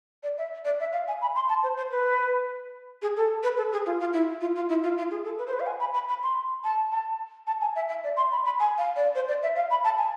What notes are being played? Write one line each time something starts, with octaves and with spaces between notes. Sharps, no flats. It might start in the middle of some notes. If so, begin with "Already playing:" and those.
D5
E5
D5
E5
F5
G#5
B5
C6
A5
C5
C5
B4
G#4
A4
B4
A4
G#4
F4
F4
E4
F4
F4
E4
F4
F4
G#4
A4
B4
C5
B4
F5
G#5
B5
B5
B5
C6
A5
A5
A5
G#5
E5
E5
D5
C6
B5
B5
G#5
F5
D5
C5
D5
E5
F5
B5
A5
G#5